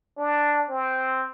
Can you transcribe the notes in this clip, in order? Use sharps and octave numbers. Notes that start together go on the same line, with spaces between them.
D4
C4